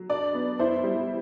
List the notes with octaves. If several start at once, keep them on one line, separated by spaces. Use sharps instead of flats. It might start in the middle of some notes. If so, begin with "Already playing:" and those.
Already playing: F#3
D4 D5
B3
E4 C5
G3